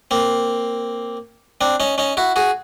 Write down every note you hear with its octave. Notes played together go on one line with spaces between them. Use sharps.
A#3 C4
C4 D4
C#4 D#4
C#4 D#4
E4 F#4
F#4 G#4